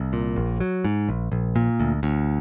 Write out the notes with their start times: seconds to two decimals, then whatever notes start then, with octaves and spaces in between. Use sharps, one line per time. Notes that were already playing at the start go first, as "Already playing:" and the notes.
Already playing: C2
0.13 A#2
0.36 A#1
0.60 F#3
0.85 G#2
1.09 A#1
1.32 A#1
1.56 A#2
1.80 D2
2.03 D2